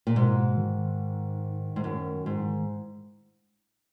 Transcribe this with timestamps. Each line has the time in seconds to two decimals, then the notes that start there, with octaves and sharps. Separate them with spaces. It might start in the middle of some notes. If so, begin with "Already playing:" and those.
0.07 A#2
0.16 G#2 B2
0.57 D#3
1.76 G#2
1.84 F#2
2.26 G#2